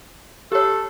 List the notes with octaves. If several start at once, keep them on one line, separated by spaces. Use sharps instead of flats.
G4 A4 C#5